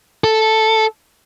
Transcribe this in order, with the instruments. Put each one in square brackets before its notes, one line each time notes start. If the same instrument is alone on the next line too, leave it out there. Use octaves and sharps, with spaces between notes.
[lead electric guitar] A4